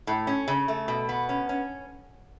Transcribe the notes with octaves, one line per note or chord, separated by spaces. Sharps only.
A2
C#4
C#3
A3
B2
B3
C#4
C#4